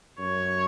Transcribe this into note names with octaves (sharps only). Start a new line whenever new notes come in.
F#2 C#5